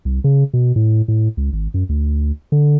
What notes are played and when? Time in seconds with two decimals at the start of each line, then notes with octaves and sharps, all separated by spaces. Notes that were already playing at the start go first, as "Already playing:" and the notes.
0.05 C2
0.24 C#3
0.53 B2
0.76 A2
1.08 A2
1.37 C#2
1.53 G#1
1.74 F#2
1.89 D2
2.52 D3